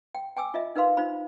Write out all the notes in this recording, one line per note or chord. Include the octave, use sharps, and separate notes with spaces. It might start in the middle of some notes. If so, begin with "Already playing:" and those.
G5
G5 G#5 D6 E6
F4 D#5 E5
D#4 A#4 B4 F5 C6
D#4 F4 C5 B5